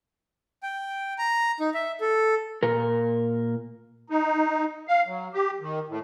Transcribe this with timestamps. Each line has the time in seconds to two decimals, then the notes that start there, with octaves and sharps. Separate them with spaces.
0.63 G5
1.18 A#5
1.60 D#4
1.74 E5
2.01 A4
2.63 A#2 A#4
4.10 D#4
4.88 F5
5.07 F#3
5.33 G4
5.61 D#3
5.89 A2